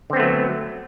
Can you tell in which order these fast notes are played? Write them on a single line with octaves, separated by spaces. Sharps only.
D3 C4 B3 A3 F#3